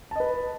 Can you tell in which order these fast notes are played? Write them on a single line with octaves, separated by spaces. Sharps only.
A5 D#5 B4